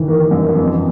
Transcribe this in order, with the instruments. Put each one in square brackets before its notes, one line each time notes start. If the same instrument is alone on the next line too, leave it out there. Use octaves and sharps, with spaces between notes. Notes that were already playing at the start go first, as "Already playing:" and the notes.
Already playing: [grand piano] D#3 E3
[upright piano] A#3
F#2
F2